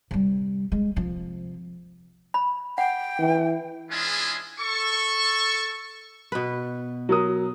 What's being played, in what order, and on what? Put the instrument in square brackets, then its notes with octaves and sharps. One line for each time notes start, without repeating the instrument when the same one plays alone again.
[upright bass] C3 G3
G#3
C3 F3
[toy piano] B5
[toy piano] F#5 [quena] G5
[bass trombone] E3
[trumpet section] G#3 C#4 D4 E4 F4 G#4
A4 C#6
[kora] B2 B4
[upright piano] F#3 A#4 D#6